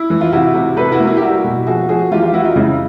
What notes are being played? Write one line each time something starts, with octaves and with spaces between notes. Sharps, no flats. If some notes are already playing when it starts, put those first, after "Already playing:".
Already playing: E4
E3
F4
C3 E4 F#4
C3
C3 A4 B4
E4 F#4
A#3
E4
G4
G3 E4 F#4
B2
F3 F#4 G#4
F3 F#4 G#4
E3 F4 G4
F4 G4
E3 E4 F#4
D#4 F4
C#3 E4